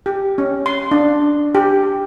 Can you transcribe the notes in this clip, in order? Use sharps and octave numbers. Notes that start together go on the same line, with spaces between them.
G4
C#4
C6
D4
G4